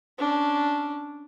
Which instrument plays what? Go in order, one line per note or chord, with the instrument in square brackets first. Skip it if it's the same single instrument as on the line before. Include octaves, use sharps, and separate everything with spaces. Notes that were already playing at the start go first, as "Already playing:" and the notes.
[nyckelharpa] C#4 D4